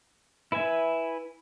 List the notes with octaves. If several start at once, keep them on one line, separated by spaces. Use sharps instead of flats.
E4 B4 E5 G#5